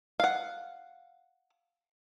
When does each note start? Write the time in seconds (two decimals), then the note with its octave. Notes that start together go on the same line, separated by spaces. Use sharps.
0.20 F5 F#5